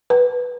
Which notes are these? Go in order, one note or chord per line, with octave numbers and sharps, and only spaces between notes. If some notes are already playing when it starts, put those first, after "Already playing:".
B4